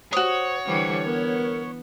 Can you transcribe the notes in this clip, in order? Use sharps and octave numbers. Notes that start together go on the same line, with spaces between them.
F#4 C5 C#5 D#6
D3 E3 G3 C5
B3 A#4